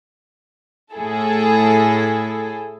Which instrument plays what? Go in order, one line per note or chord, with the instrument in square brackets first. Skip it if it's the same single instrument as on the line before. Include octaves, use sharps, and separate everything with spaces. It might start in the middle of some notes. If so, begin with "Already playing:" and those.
[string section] A2 E4 G#4 A4